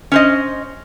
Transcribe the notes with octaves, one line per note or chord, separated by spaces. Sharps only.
C#4 C5 D#5